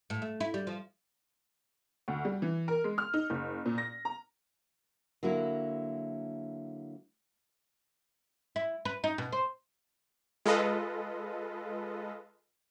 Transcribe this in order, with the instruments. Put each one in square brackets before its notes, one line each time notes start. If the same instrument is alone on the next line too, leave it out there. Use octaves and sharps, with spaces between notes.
[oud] A2
A3
E4
G3
F3
[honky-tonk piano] D2
G3
E3
A#4
G#3
F6
D#4
F#1
A#2
A#6
A#5
[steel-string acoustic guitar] D3 F#3 A#3 E4
[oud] E4
B4
D#4
B2
C5
[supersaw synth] G#3 F4 A4 B4 D#5